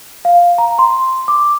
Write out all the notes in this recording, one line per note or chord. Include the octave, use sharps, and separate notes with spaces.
F5
A#5
C6
D6